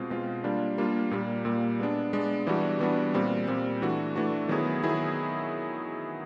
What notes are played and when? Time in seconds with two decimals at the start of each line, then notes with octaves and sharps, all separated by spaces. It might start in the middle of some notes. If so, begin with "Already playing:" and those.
Already playing: B2 G#3 C4 F4
0.10 B2 G#3 C4 F4
0.44 G3 A#3 D4 F4
0.78 G3 A#3 D4 F4
1.11 A#2 G3 A#3
1.45 A#2 G3 A#3
1.79 G#3 B3 D4
2.13 G#3 B3 D4
2.47 E3 G3 B3 D4 F#4
2.80 E3 G3 B3 D4 F#4
3.14 A#2 G3 C4
3.48 A#2 G3 C4
3.82 E3 A3 D4 F#4
4.15 E3 A3 D4 F#4
4.49 D#3 F#3 B3 E4 G#4
4.83 D#3 F#3 B3 E4 G#4